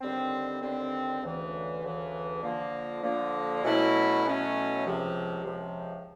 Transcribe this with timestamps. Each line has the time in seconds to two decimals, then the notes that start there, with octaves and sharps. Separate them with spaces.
0.01 D#2 D3 G3 C4
0.61 D#2 D3 G3 C4
1.22 D2 C#3 E3
1.82 D2 C#3 E3
2.43 D3 F3 A#3
3.03 D3 F3 A#3
3.63 B2 F#3 A3 C#4 E4
4.24 B2 F#3 A3 C#4 E4
4.84 C#2 C3 F3
5.45 C#2 C3 F3